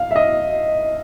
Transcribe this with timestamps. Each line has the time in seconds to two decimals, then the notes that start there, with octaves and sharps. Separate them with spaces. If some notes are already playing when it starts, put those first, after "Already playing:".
Already playing: F5
0.11 E5
0.16 D#5